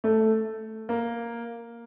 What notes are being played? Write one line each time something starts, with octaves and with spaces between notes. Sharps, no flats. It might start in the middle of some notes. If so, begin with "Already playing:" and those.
A3
A#3